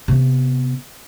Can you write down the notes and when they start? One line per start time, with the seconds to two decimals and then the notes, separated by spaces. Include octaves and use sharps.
0.08 C3 B3